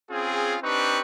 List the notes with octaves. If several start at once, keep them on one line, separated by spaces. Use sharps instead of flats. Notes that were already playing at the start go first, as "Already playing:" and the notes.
C4 C#4 F4 G#4
C4 D4 D#4 G4 B4 C#6